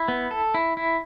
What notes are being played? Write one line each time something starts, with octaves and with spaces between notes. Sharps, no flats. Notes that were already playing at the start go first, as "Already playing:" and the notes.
Already playing: E4
B3
A4
E4
E4